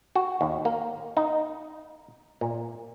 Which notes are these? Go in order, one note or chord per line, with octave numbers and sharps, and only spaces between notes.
F#4
D#2
A#3
D#4
A#2